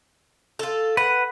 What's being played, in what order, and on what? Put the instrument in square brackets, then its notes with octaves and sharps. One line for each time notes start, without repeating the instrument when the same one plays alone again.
[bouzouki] F4 A4
[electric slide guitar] B4 [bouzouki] F#5